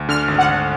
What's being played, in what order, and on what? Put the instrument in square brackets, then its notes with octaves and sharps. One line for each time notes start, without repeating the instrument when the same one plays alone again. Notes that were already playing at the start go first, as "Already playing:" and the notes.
Already playing: [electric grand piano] D2
[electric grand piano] D3 [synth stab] F6
[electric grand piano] G#1
[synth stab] F#5
[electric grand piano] G#1